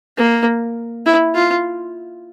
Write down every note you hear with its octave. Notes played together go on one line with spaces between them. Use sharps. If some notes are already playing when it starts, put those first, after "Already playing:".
A#3
E4
F4